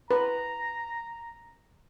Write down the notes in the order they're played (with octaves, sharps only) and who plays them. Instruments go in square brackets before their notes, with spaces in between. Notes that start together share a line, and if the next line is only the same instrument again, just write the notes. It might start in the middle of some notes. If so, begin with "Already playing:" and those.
[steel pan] B4 [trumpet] A#5